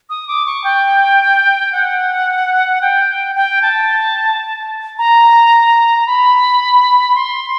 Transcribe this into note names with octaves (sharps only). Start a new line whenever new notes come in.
D#6
D6
C#6
G5
F#5
G5
G5
A5
A#5
A#5
B5
C6